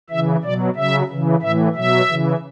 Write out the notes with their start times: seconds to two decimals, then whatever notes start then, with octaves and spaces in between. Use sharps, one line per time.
0.10 C#3 E3 E5
0.43 B2 F#3 D5
0.76 C#3 F#3 E5
1.10 C#3 E3
1.42 A2 E3 E5
1.75 B2 F#3 E5
2.09 C#3 E3